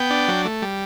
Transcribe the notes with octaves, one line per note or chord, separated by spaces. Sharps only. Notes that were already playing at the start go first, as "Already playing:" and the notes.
Already playing: B3 G5
D4
F#3
A3
G3